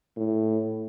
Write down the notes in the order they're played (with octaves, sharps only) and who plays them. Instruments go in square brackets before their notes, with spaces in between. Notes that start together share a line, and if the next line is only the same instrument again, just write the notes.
[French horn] A2